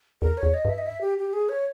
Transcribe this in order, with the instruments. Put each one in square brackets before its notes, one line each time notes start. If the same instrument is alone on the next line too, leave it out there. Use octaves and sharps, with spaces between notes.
[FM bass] E2 [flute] A#4
[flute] C#5
[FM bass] E2
[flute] D#5
[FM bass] G2 [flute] E5
[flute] D#5
E5
G4
G4
G#4
C#5